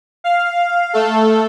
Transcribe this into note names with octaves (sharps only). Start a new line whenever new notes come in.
F5
A3 A4